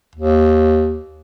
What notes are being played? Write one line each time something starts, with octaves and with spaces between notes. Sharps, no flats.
D#2